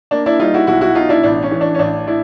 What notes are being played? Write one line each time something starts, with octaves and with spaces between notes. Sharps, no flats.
A#3 D4
D4 E4
G3 D#4 F4
E4 F#4
B1 E4 F#4
E4 F#4
B2 D#4 F4
D4 E4
A1 D4
C#4
E3
D4
C#4
A1 D4
A2 D4 E4